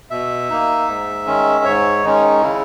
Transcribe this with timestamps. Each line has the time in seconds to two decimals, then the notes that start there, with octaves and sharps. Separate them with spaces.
0.10 B2 E5
0.50 A#3 D#4
0.88 G#2
1.26 D#3 G#3 C#4
1.65 G#2 C#5
2.04 D#3 G#3 C#4 D#4
2.42 C#3 E4